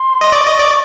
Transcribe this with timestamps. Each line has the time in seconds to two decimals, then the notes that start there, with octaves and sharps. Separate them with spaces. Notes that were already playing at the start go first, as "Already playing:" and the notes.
Already playing: C6
0.21 D#5
0.32 D5 C#6
0.46 D#5
0.59 D5